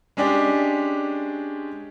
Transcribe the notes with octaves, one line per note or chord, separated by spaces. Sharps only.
G#3 C#4 D4 G4